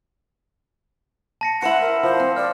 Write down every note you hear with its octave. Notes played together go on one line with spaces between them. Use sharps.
A5 A#6 C#7
E4 C5 F#5 C#7 E7 F#7
A#4
F3 C5
C4
D5 F6